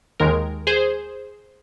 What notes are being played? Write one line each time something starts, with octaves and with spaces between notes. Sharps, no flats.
D#2 D#3 G#3 A#4
G#4 C5